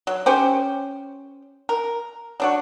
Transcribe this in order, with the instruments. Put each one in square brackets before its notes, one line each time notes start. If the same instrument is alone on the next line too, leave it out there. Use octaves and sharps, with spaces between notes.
[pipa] F#3
C#4 G4 C5
A#4
F#3 D4 F#4